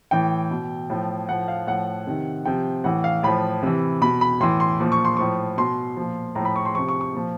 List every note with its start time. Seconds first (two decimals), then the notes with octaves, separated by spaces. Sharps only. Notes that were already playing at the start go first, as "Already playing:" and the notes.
0.11 A2 E3 G5
0.51 B2
0.90 A2 F3
1.29 A2 F3 F#5
1.48 F5
1.67 A2 F3 F#5
2.07 C3 D#3
2.45 C3 F3 G5
2.84 A2 E3 F#5
3.04 F5
3.23 A2 F3 B5
3.63 C3 E3
4.01 B2 B5
4.21 B5
4.40 A2 E3 C6
4.60 C6
4.80 A#2 F3
4.92 C#6
5.05 C6
5.17 A2 F3 C#6
5.58 B2 C6
5.96 A#2 F3
6.35 A2 F3 A#5
6.45 B5
6.56 C#6
6.65 C6
6.75 C3 F3 C#6
6.88 C#6
7.01 C#6
7.14 A#2 F3